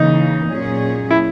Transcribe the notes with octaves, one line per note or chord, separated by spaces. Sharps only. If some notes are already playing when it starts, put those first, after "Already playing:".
Already playing: C#3 E3 A#3 D#4
A#2 F#3 C#4 G#4
E4